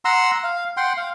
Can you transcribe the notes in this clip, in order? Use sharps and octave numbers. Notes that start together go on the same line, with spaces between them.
F#5 A#5 C6 E6
F5
F#5 G5 C6
F5